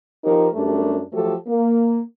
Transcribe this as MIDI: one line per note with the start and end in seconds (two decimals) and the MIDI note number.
0.24 0.47 53
0.24 0.47 60
0.24 0.47 63
0.24 0.47 67
0.24 0.47 70
0.54 1.01 42
0.54 1.01 55
0.54 1.01 57
0.54 1.01 62
0.54 1.01 67
0.54 1.01 70
1.12 1.34 53
1.12 1.34 54
1.12 1.34 57
1.12 1.34 67
1.12 1.34 69
1.47 1.99 58